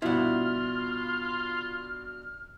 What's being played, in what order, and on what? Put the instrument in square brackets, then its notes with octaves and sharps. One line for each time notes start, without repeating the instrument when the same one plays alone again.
[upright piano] G2 B2 F3 [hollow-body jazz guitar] E4 F#5 [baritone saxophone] F4 [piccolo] F6